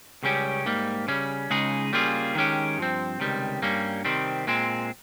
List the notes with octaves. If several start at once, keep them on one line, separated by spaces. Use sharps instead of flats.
C#2 C#3 G3 C#4 G4
G#2 G3 A#3
C#3 G3 C#4
C#2 C#3 G#3 D#4 G#4
C#3 G3 A#3 F4 G#4
D#3 G#3 C#4 G4
G2 F3 C4
C#2 C3 D#3 G3
G2 G3 A#3 C#4
C3 D#3 G3 C4
A#2 G#3 C4